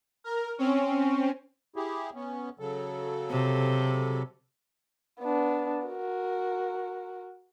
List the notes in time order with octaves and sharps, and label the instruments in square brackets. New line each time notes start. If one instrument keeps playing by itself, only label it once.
[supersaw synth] A#4
C4 C#4
[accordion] E4 G4 G#4
B3 C#4
C#3 F#3 A4
[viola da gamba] C3
[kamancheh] B3 D4
F#4 A#4